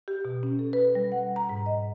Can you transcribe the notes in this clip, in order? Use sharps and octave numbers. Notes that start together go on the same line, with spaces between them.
G4
B2
C#4
A4
B4
G3
F#5
A#5
G#2
D#5